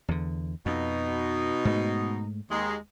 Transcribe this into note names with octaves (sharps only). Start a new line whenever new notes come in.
E2 D3
F2 B2 D#4
G#2 A3
D#2 G#3